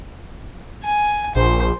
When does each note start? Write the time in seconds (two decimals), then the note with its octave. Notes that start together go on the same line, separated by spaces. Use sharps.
0.84 G#5
1.35 A#1 C5